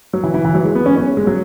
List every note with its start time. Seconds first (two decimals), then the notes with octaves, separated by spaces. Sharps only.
0.13 F#3
0.24 E3
0.34 E3
0.45 E3
0.55 F#3
0.65 G#3
0.75 B3
0.86 C#4
0.96 C#4
1.17 G#3
1.27 F#3